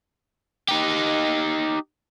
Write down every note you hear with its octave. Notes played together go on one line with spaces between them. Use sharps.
D#4 G4